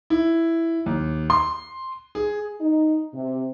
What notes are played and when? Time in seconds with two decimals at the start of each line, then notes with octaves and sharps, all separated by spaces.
0.10 E4
0.86 D#2
1.30 C6
2.15 G#4
2.61 D#4
3.13 C3